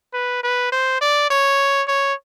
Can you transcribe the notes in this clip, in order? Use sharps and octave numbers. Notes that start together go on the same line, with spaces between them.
B4
B4
C5
D5
C#5
C#5